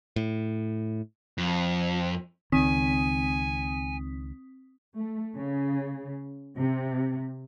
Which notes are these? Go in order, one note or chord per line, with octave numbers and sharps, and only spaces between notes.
A2
F2
C#2 D#3 C4 G#5 D#6 B6
A3
C#3
C3